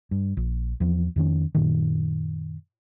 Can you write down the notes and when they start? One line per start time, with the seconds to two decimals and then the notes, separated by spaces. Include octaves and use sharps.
0.11 G2
0.37 A#1
0.80 E2 F3
1.16 F2 D#3 C#4
1.55 F#2 A#2 D#3